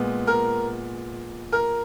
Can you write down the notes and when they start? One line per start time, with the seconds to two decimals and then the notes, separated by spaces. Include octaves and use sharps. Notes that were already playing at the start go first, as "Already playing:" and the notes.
Already playing: A#2 G#3 B3
0.27 A#4
1.52 A#4